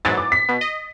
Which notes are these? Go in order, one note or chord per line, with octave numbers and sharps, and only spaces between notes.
G#2 E3 F#3 A6
D6
B6
B2
D#5